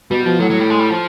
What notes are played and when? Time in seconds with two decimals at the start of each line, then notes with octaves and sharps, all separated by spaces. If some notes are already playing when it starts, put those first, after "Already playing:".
0.11 B2 G3
0.25 B2 F3
0.39 A2 F#3
0.50 F#3
0.60 G3
0.70 G#3
0.79 G3
0.90 F3